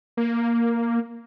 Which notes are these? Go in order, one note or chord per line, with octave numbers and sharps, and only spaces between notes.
A#3